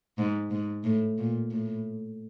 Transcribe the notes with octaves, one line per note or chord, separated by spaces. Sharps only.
G#2
G#2
A2
A#2
A2